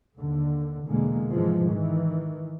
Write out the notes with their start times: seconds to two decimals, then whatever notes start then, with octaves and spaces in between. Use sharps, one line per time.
0.18 D#2 D3
0.87 E2 B2 D3 G#3 A#3
1.31 G#2 C3 E3 F3 G#3
1.69 D#3 E3